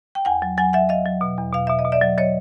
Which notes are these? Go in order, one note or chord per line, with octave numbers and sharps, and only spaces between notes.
G5
E2 F#5 G#5
F#3
F#3 F#5 G#5
F#3 E5 F#5
F#3 D#5 F5
F#3
B2
E2
B2 F5
B2 E5
D#5
B2
D5 E5
F#3
F#3 C#5 D#5